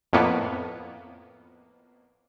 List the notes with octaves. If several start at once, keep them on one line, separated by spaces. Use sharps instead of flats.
F2 A2 A#3 B3